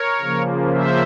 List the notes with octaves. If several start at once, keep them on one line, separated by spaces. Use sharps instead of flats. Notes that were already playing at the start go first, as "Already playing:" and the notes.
Already playing: A#4 C#5
C#3 F3 A#3
C5 E5